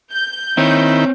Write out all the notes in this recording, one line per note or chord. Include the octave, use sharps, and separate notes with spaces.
G6
D#3 C4 E4 C#5